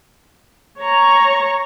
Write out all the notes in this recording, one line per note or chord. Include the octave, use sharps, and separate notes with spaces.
C#5 A#5 C#6